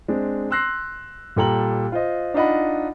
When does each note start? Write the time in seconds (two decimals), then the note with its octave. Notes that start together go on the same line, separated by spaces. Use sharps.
0.08 G#3 C4 D4
0.51 C6 E6 F#6 A#6 C7
1.36 A#2 G3 A4 G5 A#5 F#7
1.92 F4 C5 D#5
2.34 D4 D#4 F4 D#5 F#5 B5